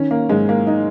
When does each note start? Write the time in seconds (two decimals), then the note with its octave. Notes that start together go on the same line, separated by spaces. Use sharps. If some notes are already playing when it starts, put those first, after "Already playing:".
Already playing: D#3 C#4
0.11 A#3
0.29 G#2 G#3
0.49 A#3
0.67 D#4